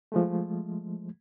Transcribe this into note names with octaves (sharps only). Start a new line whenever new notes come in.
F3 G#3 A3